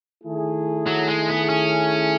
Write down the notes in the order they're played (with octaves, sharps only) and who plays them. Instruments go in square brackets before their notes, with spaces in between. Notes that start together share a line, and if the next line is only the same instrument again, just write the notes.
[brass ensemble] D#3 A3 E4 G#4
[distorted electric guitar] F#3
G#3
B3
C#4